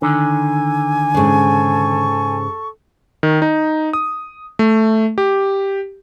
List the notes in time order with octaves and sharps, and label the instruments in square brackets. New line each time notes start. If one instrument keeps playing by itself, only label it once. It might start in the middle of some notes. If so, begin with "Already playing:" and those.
[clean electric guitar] D3 D#3 [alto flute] G#5
[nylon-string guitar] G#2 C#3 [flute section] A4 C#6
[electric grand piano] D#3
D#4
D#6
A3
G4